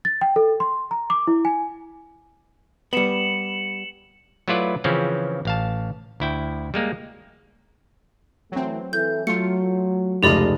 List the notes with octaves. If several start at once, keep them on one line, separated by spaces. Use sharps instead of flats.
A6
G5
A4
C6
A#5
D6
E4
G#5
G3 B3 C#7 E7 F#7
F#3 A3 E4 F4 B4 D5
C#3 E3 F3 C4 C#4
A1 F5 A5
D2 E4 G5
G3 G#3 A#3
E3 F#3 A3 C4
E3 E4 A4 G6
F#3 A3 F4 C#7
F1 C#2 A3 F4 G4 D5 D#5 B5